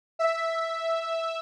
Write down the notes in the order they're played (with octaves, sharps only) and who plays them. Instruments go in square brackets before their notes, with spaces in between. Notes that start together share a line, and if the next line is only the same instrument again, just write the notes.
[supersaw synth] E5